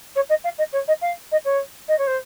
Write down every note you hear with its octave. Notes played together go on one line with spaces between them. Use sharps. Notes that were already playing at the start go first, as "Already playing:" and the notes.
C#5
D#5
F5
D#5
C#5
D#5
F5
D#5
C#5
D#5
C#5
C5